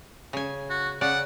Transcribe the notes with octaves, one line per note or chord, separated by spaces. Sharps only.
C#3 G#5
F#4
C#3 D5 F#5